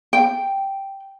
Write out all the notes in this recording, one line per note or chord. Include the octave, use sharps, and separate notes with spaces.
G5